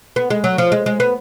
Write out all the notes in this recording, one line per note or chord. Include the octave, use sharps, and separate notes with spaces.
B3
G#3
F#3
F3
G#3
G#3
B3